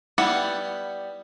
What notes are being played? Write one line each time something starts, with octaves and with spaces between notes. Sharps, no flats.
G3 B3 E4 F#5